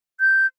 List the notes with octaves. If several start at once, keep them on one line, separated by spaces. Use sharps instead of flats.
G6